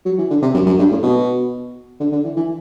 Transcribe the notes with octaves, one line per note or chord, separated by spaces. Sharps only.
F#3
E3
D3
C3
F#2
F#2
G2
A2
B2
D3
D3
E3
E3